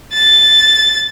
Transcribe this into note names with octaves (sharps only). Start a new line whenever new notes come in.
A6